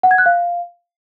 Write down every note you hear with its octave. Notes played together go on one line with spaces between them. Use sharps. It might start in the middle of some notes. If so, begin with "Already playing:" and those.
F#5
G#6
F#6
F5